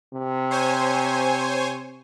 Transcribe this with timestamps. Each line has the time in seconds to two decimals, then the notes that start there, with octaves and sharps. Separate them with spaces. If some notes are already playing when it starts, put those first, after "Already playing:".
0.13 C3
0.51 C5 C#5 G#5